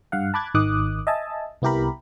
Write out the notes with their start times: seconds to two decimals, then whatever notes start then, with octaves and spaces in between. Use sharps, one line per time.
0.12 G2 F5 F#5
0.34 A5 B5 D6 F#6 G#6 A6
0.54 G#1 D#3 D6 D#6 F#6
1.07 D#5 E5 G#5 A5
1.62 C2 B3 E4 G4 A#4 B5